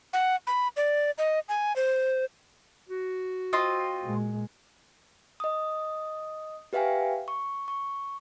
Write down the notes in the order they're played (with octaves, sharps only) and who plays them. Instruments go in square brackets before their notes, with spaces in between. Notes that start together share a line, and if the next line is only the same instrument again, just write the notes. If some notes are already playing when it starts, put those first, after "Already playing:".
[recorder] F#5
B5
D5
D#5
G#5
C5
[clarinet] F#4
[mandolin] C4 F4 D#5
[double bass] A#2 G#3
[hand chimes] D#5 D#6
G4 B4 E5 F5 G5 G#5
C#6
C#6